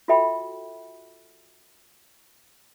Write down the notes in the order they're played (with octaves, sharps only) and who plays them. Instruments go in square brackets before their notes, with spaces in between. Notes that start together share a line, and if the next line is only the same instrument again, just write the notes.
[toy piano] F4 F#4 A4 E5 G5 B5